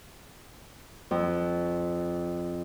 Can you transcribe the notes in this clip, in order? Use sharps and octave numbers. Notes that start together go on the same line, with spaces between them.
F2